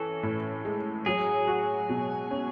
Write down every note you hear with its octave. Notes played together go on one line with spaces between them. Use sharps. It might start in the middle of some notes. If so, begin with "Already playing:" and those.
Already playing: E3 C#4 A4
A2
G#3
F#3 G#4
F#4
B2
C#4